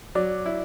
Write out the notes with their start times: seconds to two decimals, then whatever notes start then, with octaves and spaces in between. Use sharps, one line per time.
0.15 F#3 D5
0.46 E4